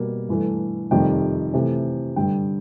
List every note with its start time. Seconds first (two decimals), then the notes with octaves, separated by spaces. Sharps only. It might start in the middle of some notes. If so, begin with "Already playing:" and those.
Already playing: B2 G3 A#3
0.29 G2 E3 A3
0.91 F2 C3 D#3 G3 G5
1.54 C3 E3 A3
2.16 G2 D3 G3 G5